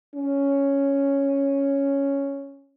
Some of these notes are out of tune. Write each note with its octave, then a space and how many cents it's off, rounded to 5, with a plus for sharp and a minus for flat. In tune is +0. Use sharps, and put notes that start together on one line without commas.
C#4 +0